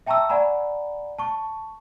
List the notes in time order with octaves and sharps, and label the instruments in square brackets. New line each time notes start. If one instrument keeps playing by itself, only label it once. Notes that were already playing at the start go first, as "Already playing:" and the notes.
[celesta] E5 G5 A5 A#5 C#6 E6
D5 F#5 G#5 A#5 B5
A5 C#6